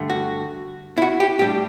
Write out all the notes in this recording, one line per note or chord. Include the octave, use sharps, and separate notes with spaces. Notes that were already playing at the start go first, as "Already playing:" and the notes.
Already playing: G2 D3 A3
F#4
E4
F#4
G4
A2 G3 D4 G4